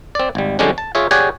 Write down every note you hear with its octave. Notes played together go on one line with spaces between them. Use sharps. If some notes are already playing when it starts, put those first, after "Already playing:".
C4 D5
G#1 G3
F2 D3 G3 G#3 C#4 D4
A5
F4 G#4 C#5 E5
G4 G#4 C#5 D5 F#5 G#5